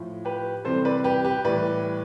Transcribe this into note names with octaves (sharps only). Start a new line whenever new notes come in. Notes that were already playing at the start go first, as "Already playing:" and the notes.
Already playing: A2 F3
G4 B4
C3 E3 G3 A4 C5
B4 D5
G4 B4
G4 B4
A2 E3 G3 B4 D5